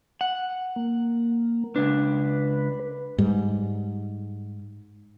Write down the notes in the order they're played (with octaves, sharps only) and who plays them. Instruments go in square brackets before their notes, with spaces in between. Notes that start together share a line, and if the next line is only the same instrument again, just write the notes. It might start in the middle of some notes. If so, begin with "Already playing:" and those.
[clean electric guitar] F#5
[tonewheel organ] A#3
[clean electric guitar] C#2 D4 [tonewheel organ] B4
[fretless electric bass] G#2 G3